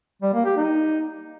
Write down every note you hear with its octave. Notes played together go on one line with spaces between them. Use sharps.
G3
A#3
G4
D#4